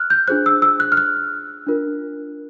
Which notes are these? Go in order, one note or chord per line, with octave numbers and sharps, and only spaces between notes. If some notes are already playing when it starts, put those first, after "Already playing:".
Already playing: F6 F#6
G6
D4 F4 G#4 C5 F#6
E6
E6
F#6
F6
F#6
D4 F4 A#4